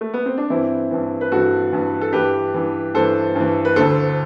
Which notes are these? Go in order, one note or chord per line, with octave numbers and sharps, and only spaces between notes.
A3
B3
C4
D4
G2 E3 C4 E4
G2 E3
B4
G2 E3 F#4 A4
G2 E3
A4
G2 E3 G4 B4
G2 E3
G2 E3 A4 C5
G2 E3
B4
D2 D3 A4 C5